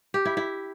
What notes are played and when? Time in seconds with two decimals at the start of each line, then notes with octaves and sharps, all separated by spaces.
0.14 G4
0.25 E4
0.37 E4